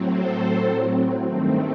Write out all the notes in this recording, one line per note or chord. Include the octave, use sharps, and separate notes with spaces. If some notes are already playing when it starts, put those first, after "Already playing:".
Already playing: A2 F#3 C4
A4 C5
G2 D#3 A3 C4